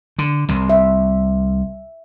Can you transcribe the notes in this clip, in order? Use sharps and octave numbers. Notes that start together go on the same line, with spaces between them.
D3
C2 C3
E5